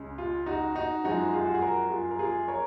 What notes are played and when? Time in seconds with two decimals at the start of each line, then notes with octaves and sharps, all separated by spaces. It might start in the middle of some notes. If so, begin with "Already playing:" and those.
Already playing: C#2 C#3 G#3
0.18 F4
0.46 D#4 F#4
0.75 D#4 F#4
1.04 F#2 F3 G#3 D#4 F#4
1.33 F4 G#4
1.45 F#4
1.54 G#4
1.62 F#4 A#4
1.90 F4 G#4
2.11 A#4
2.19 F4 G#4
2.48 A#4 C#5